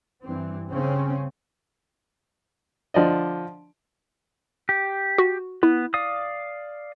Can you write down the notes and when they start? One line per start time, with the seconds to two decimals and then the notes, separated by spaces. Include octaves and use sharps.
0.22 G2 E3 C4
0.68 G2 C#3 C4 C#4
2.94 D3 F3 D5 D#5
4.69 G4
5.18 F#4
5.63 B3 E4
5.94 D5 F5 D#6